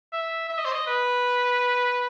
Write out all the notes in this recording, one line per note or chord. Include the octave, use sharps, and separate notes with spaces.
E5
E5
D#5
C5
D#5
B4